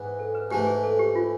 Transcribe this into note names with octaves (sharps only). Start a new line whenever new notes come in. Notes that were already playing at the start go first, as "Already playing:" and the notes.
Already playing: G#2 E3 B3
A4
B4
G#2 E3 A3 G4
G#4
A4
G4
F4